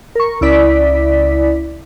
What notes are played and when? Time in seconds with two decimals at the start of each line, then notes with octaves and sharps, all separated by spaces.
0.15 A#4 C#6
0.41 C#2 E4 D5 B6